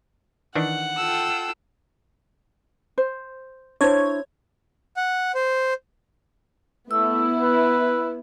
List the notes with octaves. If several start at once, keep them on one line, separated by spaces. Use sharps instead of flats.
D#3 E3 D4 F#5
F4 A4 G5 E6
C5
D4 E4 C5 C#5 G#6
F#5
C5
A3 B3 E4 E6
B4